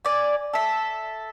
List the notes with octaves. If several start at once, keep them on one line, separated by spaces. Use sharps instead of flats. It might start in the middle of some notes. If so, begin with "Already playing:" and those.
D5 G#5
A4 E5